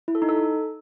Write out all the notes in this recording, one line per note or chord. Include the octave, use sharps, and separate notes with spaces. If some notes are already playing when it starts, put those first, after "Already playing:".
E4
A4
D#4
A4